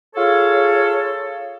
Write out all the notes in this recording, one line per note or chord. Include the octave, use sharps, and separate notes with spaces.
F4 G#4 A4 C#5